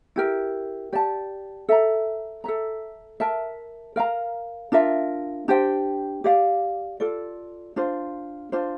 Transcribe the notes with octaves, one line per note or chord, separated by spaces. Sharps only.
E4 G4 A#4
G4 D5 A5
A4 E5 A#5
A4 E5 A#5
A#4 E5 A5
A#4 F5 A#5
D4 F4 A#4 E5
D4 G4 C5 G5
G4 D5 F5
F4 A4 D5
D4 F4 C5
D4 F4 C5